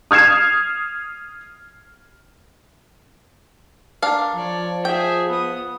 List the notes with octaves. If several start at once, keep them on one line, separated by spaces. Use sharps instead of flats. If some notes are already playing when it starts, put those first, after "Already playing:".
D#6 F6 G#6 C7 E7
D4 A#4 F5
F3 C#5 D5
G#4 E5 G5
B3 D#6